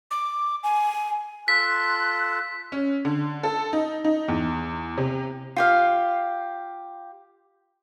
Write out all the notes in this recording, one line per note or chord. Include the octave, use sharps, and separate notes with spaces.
D6
G#5
F4 A4 A5 C6 F#6 B6
C#4
D3
A4
D#4
D#4
E2
C3
F4 G4 F5